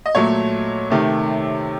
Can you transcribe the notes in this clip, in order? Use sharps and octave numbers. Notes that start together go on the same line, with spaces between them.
D#5
A#2 F#3 A3 C#5
C3 D#3 A3